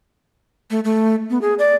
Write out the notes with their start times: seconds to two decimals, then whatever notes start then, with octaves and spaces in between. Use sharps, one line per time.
0.71 A3
0.85 A3
1.30 B3
1.42 G#4
1.59 D5